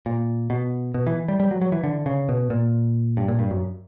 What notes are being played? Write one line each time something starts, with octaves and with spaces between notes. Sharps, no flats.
A#2
B2
B2
E3
G3
G3
F#3
F#3
E3
D3
C#3
B2
A#2
G2
A#2
G2
F#2